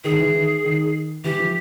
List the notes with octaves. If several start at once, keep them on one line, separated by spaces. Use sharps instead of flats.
D#3 G#4
E3
D#3
D#3
E3 G4
F3